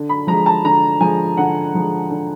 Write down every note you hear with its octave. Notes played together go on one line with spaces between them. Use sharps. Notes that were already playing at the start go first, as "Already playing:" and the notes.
Already playing: D3
B5
F3 G#3 A#5
A5
D3 A#5
F3 G#3 G#5
D3 F#5
F3 G#3
D3